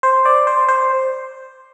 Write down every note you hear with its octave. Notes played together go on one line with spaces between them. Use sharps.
C5
D5
C5
C5